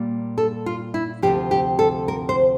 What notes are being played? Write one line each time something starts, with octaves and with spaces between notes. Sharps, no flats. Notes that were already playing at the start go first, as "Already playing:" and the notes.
Already playing: A#2 G3 A#3
A4
F4
E4
D2 C3 F3 G4
G4
A4
A#4
C5